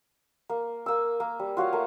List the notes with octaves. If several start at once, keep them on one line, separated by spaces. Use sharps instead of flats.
A#3
A#3 E6
A#3
G3
F4 F#4 C#5 F5
A3 A#3